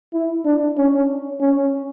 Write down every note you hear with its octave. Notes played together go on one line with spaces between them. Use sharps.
E4
D4
C#4
C#4